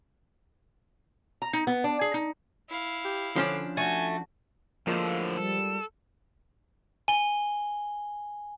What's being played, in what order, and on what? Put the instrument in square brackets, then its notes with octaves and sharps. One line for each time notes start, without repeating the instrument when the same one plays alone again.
[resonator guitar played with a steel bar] A#5
D#4
B3
D4
G#4
D#4
[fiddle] E4 F5
[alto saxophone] G4
[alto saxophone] D3 [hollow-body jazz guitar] F3 C#4 D4
[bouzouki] A3 [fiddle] F#4 [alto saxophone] G#5
[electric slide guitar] A2 D3 [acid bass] F3 [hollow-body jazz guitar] G#3 A#3 F4
[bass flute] G3 [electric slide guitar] A4
[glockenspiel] G#5 G7